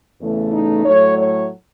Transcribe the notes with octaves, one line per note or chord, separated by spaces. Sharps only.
E2 C#3 E3 A3
D#4
A2 F#3 A3 C#5
C#5